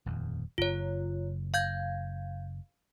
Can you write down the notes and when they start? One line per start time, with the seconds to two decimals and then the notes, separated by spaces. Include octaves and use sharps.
0.06 D#1 F2
0.58 F#1 F4 C#5
1.54 F5 G6 G#6